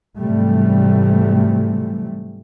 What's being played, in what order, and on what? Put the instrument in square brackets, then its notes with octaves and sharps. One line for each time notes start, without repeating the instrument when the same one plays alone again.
[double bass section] G#2 C3 E3 F#3 G3 A3